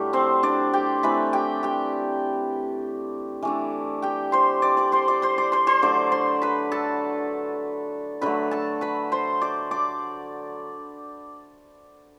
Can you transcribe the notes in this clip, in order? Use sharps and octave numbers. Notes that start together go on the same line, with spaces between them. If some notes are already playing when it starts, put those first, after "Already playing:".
Already playing: A2 F#3 G3 A3 D4 G4
C4 C5
D4 D5
G4 G5
E3 A3 C4 B4 B5
G4 G5
G4 G5
E3 A3 D4
G4 G5
C5 C6
D5 D6
D5 D6
C5 C6
D5 D6
C5 C6
D5 D6
C5 C6
C5 C6
D3 F#3 A3 D5 D6
C5 C6
B4 B5
A4 A5
D3 F#3 A3 B4 B5
A4 A5
B4 B5
C5 C6
D5 D6
D5 D6